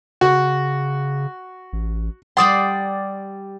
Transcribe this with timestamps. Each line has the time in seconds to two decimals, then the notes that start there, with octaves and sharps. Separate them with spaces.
0.21 C#3 F#4
1.73 A1
2.37 G3 D5 F#5 C6 D#6